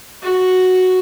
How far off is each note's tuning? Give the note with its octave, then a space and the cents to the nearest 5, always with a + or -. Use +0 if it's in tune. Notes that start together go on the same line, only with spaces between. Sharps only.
F#4 +0